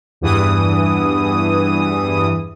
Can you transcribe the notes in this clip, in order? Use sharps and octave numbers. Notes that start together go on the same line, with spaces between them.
E2 G2 E3 D#6